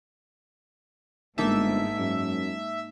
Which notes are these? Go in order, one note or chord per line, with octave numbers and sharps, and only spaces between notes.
G1 G#2 A#3 D#4 E5 A5
F#2